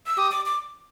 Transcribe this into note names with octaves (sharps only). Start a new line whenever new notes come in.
E6
G4 D#6
D6
D6